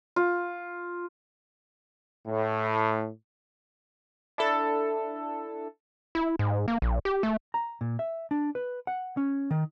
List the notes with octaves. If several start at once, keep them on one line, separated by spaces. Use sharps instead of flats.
F4
A2
D4 E4 A4
E4
G#2
A#3
A#1
G4
A3
A#5
A#2
E5
D4
B4
F#5
C#4
D#3